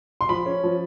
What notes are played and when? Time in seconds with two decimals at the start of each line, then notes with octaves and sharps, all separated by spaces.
0.21 C6
0.29 F3 B5
0.46 C#4
0.63 F3